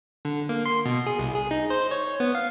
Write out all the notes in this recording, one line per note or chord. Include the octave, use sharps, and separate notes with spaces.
D3
A#3
C6
B2
G#4
C2
G#4
D#4
C5
C#5
B3
F5